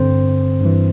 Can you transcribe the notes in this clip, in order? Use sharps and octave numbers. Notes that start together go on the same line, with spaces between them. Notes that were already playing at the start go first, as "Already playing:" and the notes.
Already playing: G2 D3 C4 C5
G2 E3